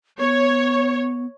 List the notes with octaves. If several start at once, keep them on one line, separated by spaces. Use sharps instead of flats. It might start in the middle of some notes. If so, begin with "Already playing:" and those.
B3 C#5